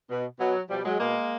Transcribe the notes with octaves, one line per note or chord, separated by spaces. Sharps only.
B2
B2 F#3
B2 F3 G3
F#3 G#3
B2 G#3 A#3